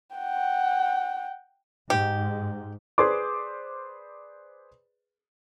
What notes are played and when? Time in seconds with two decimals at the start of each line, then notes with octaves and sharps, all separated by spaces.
0.16 F#5 G5
1.90 G#2 G4
2.98 G#4 B4 C5 D5 C6 D6